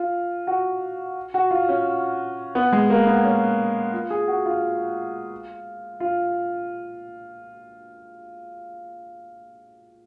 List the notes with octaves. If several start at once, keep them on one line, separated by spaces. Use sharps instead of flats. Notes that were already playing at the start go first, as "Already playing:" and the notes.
Already playing: F4
F#4
F#4
F4
C#4
B3
G#3
A#3
B3
C#4
F4
G#4
F#4
F4
F4